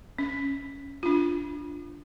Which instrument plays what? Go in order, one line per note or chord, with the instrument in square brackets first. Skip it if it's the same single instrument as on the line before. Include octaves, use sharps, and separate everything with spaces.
[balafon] C#4
D4 F4